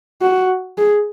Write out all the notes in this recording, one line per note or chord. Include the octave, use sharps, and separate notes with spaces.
F#4
G#4